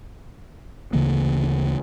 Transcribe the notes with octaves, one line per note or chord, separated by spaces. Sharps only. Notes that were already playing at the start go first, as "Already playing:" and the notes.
D2 C#3 E3 A#3